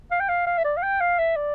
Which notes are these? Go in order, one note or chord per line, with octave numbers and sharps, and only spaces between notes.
F5
G5
F5
F5
E5
D5
F5
G5
F5
E5
D5